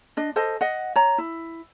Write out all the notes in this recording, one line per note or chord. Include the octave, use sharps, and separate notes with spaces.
D4 D#5
A4 C5 D#5 A5
D#5 F#5
C#5 A#5
E4